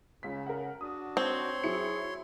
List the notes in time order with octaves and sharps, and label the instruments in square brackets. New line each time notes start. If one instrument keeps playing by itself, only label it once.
[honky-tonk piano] C#2 B6 [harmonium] C#3
[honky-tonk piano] A#4 F#5
[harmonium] D4 F#4 [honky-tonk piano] D#6
[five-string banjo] C4 [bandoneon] C#5 C6
[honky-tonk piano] F#3 E4 C#7 [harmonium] G#4